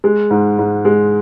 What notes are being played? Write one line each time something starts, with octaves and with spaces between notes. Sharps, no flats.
G#3
G#2
G#2
G#3